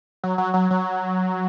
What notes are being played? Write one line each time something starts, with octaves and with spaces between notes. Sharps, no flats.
F#3
F#3
F#3
F#3